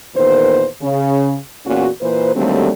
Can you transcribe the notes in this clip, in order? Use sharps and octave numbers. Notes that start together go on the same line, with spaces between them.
E2 A#2 D#3 B4 C5
C#3
E2 A#2 C#4 F#4
A#2 E3 B4 C5
D#2 D3 F#3 G3 A3 C4